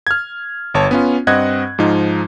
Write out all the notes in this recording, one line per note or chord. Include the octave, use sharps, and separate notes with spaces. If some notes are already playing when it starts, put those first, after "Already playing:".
F6 G#6
G1 C#5 A5
B3 C#4 F4
G2 C4 D#5 F#5 F#6 G#6
G#2 F3 D#4